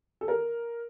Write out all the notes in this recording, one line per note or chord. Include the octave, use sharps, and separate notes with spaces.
A4
A#4